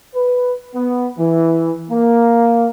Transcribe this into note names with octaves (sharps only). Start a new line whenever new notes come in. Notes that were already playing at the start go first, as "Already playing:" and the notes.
B4
B3
E3
A#3